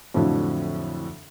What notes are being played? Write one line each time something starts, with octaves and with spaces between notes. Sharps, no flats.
F2 A2 D3 F3 F#3